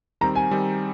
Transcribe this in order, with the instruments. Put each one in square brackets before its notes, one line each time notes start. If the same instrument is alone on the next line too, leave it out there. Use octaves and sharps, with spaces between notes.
[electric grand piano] D#3 G3 C4 [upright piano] A#5
[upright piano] G#5
[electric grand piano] D#3 G3 C4